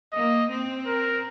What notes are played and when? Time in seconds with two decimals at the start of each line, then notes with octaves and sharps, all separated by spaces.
0.13 A#3 D#5
0.49 C4
0.86 A#4